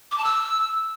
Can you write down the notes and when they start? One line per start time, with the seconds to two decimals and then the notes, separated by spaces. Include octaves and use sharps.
0.12 D6
0.18 A5
0.24 E6